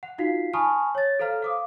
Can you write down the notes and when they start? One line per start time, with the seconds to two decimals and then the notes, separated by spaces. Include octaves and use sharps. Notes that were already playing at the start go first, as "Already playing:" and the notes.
0.03 F#5
0.18 D#4 F4 F#4 F5 B6 C7
0.53 G#5 A5 B5 C#6 D#6 F6
0.95 C#5 A6
1.19 A4 C5 F5 A#5 F6
1.42 F5 D6 D#6